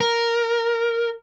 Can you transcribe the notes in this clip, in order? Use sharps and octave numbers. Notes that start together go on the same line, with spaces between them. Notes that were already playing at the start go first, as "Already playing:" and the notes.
A#4